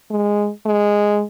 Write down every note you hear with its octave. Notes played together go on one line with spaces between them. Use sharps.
G#3
G#3